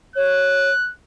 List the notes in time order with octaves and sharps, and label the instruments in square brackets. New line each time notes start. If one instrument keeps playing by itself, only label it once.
[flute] C#5 [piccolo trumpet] F#6